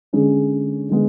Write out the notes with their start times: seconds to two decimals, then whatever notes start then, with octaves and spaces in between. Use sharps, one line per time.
0.13 D3 G#3 C#4 G#4
0.89 D3 G#3 B3